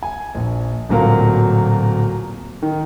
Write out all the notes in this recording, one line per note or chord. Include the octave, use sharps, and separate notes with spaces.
G#5
A#1
D1 A#2 F#3 A#4 F5
D#3